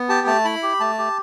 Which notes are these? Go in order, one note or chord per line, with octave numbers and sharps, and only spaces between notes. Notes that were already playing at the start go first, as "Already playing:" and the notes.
Already playing: B3
G4 A5
A3 A5
E4 B5
G4
A3 A5
G4